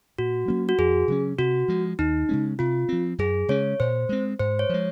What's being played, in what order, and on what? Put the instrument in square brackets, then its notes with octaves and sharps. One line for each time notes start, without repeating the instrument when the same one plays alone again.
[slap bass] A#2 [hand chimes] F#4
[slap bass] F#3 A#3 C#4
[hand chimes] F#4
[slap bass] F2 [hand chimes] G#4
[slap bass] C#3 F#3 C#4
[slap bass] C3 [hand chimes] F#4
[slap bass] F3 G#3
[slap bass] D#2 [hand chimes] D#4
[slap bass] C#3 G#3 C#4
[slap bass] C3 [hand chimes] F4
[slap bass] F3 C4
[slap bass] F#2 [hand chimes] G#4
[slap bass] C#3 G#3 C#4 [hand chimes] C#5
[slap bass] A#2 [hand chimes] C5
[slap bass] G#3 C4
[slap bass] G#2 [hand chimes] C5
[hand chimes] C#5
[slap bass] F3 G#3